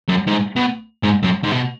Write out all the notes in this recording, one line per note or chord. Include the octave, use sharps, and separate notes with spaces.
F#2
G#2
B2
G#2
F#2
G#2
B2